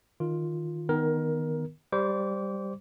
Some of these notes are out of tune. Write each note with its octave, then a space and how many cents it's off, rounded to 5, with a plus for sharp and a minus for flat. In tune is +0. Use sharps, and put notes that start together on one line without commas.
D#3 +0 F4 +0
D#3 +0 B3 +0 A#4 +15
G3 +0 C5 +0 D6 -30